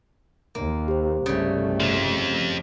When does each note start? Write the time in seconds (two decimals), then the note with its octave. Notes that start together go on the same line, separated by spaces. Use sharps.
0.55 D#2 A#3
0.88 G4 C5
1.26 G1 C2 C#3 G3 A3
1.80 F2 F3